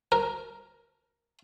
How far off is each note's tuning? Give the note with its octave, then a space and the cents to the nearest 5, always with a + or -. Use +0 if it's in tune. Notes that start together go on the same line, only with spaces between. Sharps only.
A#4 +5